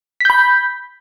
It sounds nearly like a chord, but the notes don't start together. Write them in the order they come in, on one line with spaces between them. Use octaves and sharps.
B6 G6 B5